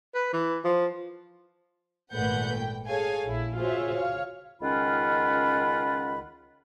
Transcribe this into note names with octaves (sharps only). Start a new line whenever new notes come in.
B4
E3
F3
G#1 A#2 A3 B4 F#5 G6
G5
G#4 A4 C#5 F5 G#5
A#1 E4
F4 F#4 G#4 C5 C#5 E5
C#5 F5
C#2 D#3 C#4 F4 F#5 B5